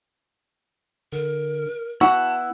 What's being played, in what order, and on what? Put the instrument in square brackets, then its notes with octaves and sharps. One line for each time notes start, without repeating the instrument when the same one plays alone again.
[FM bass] D3 [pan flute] A#4
[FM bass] B3 [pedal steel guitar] E4 F#5 [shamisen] F#4 [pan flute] A5